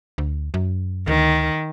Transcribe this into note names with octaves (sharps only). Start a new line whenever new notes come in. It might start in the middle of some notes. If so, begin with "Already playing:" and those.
D2
F#2
D2 D#3